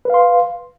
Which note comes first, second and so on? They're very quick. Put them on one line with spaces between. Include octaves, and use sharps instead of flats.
B4 F5 C6